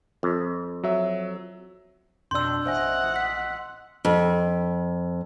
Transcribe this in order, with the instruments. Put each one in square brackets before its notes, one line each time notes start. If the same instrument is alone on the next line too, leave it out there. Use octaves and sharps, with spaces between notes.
[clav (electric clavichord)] F2
[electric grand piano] F#3 E5
[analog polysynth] F2 B2 D4 [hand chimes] D5 G6 [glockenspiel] C6 E6
[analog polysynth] A1 D#5 [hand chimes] C5 E5 G#5 [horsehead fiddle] F#5
[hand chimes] B6
[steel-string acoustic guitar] F2